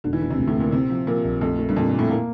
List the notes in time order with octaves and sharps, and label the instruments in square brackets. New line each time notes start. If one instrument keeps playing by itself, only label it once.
[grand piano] E1 [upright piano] D3
[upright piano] E3
[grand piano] E1 [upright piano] D3
[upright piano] C3
[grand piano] D2
[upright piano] A2
[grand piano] D2 [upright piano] A#2
[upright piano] C3 [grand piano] C4
[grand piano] F3
[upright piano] A#2 [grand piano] F3
[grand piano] A#1
[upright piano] F2 [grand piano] A3
[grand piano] A3
[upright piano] G2
[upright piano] F2 [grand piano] A#2
[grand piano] A#2
[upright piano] A2
[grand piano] A#3